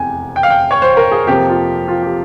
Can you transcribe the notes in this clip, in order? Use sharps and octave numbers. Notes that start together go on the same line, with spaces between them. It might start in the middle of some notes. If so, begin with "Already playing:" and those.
Already playing: F1 E2 C3 G5 G#5
G5
F5
G5
C#5
C5
A#4
G#4
F2 C3 F3 A#3 G4
F4
F4
G4